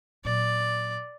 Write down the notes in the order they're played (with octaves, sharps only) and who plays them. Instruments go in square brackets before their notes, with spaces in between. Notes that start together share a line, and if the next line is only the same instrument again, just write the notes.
[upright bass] A#2 F#3 [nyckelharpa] D5